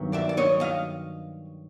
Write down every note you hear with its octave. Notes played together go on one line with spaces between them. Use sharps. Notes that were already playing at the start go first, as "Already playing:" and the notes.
Already playing: G2 D#3 F#3 B3
D5 E5
D5
C#5 D#5
D#5 F5